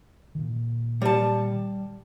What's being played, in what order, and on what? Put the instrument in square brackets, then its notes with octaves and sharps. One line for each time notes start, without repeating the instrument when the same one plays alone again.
[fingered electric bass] A#2 D#3
[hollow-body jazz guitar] G3 A5